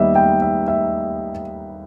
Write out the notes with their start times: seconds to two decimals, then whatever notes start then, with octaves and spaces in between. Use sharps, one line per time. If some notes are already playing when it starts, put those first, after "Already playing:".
Already playing: D#2 D#3 G3 B3 D#5 E5
0.15 G5
0.42 E5
0.68 E5